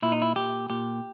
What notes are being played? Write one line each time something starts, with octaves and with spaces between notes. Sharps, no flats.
A#2 E4
D#4
E4
A#2 G4
A#2 G4